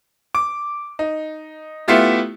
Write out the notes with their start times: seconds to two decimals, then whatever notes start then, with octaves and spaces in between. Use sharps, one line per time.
0.35 D6
0.99 D#4
1.88 A3 B3 E4 F4 G4